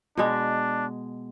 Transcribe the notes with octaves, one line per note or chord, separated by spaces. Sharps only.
B2 G#3 D4